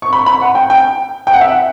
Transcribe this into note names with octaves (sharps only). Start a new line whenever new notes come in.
C#6
B5
B5
F#5
G5
G5
G5
F#5
E5
F#5